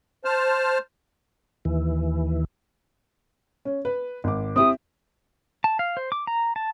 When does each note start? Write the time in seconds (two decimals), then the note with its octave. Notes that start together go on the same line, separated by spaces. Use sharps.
0.25 C5 A5 F6
1.65 D#2 E3
3.65 C#4
3.85 B4
4.24 G#1 D6
4.56 C4 E4 G4 D#6
5.64 A5
5.79 F5
5.97 C5
6.12 D6
6.27 A#5
6.56 A5